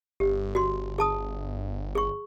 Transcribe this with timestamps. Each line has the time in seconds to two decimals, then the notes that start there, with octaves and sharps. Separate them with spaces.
0.20 G1 G4
0.55 F#4 C6
0.98 G#4 A5 D#6
1.95 G#4 C#6